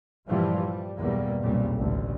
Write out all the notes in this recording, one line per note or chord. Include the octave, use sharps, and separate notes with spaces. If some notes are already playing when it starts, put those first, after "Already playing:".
G2 A#2 E3 F3 G3
G3
B1 E2 G3 A#3
B1 F2 A#2 C#3 G3
A1 D2